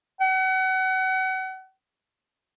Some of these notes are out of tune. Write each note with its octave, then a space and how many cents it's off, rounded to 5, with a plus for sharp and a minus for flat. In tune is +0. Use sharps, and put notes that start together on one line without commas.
F#5 +30